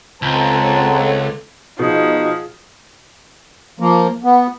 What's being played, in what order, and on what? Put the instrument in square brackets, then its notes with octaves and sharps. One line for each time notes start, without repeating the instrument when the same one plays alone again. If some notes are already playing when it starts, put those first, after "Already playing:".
[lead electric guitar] C#2 [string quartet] G#3 C4 [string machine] A4 C#5 F#5 [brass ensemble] A5 A#5
[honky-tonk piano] B2 [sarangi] F3 [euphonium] D#4 [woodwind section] G#4
[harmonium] F3 A#3
B3